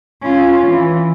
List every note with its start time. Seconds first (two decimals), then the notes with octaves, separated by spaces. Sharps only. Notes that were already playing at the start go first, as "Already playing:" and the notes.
0.21 C#4 F4
0.66 E3